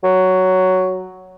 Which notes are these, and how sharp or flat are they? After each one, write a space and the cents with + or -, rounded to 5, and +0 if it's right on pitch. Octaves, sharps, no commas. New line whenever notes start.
F#3 +5